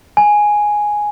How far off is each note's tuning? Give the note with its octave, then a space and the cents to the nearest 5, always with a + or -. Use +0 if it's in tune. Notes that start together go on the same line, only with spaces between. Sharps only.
G#5 +0